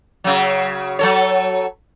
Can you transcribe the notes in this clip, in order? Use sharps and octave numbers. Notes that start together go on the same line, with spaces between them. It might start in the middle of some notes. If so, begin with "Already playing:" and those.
C#3 F#3
F#3 A4 C#5